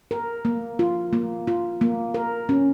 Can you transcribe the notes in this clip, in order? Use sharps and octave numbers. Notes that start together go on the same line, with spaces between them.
A#4
A#3
F4
A#3
F4
A#3
A#4
C#4